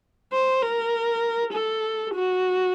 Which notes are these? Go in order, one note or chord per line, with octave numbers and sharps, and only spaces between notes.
C5
A#4
A4
F#4